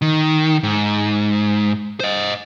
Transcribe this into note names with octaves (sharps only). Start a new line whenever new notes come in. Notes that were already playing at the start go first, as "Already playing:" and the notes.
D#3
G#2
C5 D#5